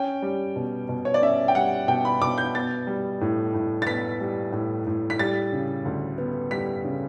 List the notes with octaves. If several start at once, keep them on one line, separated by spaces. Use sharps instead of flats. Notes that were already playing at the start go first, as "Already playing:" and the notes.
Already playing: C#4 G5
G3
B2
B2
C#5
D5
C#4 E5
G5
G3 F#5
B2 G5
B5
B2 D6
G6
B3 A6
G3
A2
A2
A6
B3 B6
G3
A2
A2
B6
G3 A6
C#3
D2
B3
G3 B6
C#3